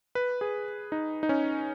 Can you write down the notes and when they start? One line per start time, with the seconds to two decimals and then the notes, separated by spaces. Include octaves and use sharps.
0.15 B4
0.41 G#4
0.92 D#4
1.23 D#4
1.29 C#4